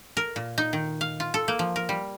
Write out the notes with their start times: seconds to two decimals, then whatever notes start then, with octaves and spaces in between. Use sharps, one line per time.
0.17 A#4
0.36 A#2
0.58 D#4
0.73 D#3
1.01 F5
1.20 F4
1.34 A4
1.48 A#3
1.59 F3
1.76 A#4
1.89 G3